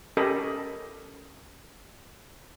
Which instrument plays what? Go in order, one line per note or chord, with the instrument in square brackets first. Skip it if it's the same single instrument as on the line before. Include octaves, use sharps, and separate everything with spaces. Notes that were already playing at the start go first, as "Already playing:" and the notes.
[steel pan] C#4 G4 A4 A#4 D#5 B5